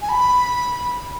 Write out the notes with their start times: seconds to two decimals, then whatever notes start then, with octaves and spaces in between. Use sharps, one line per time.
0.02 G#5
0.09 B5